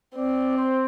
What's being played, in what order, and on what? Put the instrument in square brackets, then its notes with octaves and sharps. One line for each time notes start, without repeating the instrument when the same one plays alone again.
[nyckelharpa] C4 [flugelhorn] D5
[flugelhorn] C5